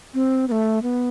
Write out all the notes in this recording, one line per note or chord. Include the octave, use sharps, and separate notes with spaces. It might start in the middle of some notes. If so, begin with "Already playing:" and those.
C4
B3
A3
B3